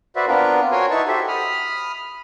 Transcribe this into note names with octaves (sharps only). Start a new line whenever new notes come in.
F#4 B4 C5 D5 E5
B3 C4 D4 F4 A#4 B4
F#4 A#4 C#5 G#5 C6
D#4 E4 B4 A5 C#6
F#4 G4 A4 C5 E5
B5 D#6 F6